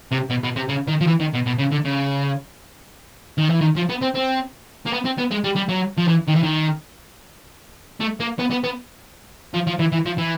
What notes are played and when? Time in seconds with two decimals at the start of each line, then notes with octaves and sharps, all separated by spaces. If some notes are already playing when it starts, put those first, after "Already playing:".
0.11 C3
0.30 B2
0.43 B2
0.56 C3
0.69 C#3
0.88 D#3
1.01 F3
1.07 E3
1.20 D#3
1.33 B2
1.46 B2
1.58 C#3
1.71 D3
1.85 C#3
3.38 D#3
3.50 E3
3.61 D#3
3.76 F3
3.90 B3
4.02 C4
4.15 C4
4.86 A#3
4.93 B3
5.05 C4
5.18 B3
5.31 G#3
5.44 G3
5.56 G3
5.69 F#3
5.97 F3
6.08 E3
6.27 D#3
6.35 E3
6.43 D#3
8.00 A3
8.20 A#3
8.39 B3
8.51 B3
8.64 B3
9.54 F3
9.67 F3
9.79 E3
9.92 E3
10.06 F3
10.18 E3